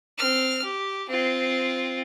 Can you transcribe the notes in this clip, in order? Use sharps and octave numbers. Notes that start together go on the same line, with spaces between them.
C4 F6
G4
C4 F4